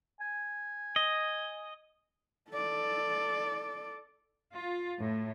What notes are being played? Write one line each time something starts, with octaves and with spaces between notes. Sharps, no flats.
G#5
D#5
A4 D5
F4
A2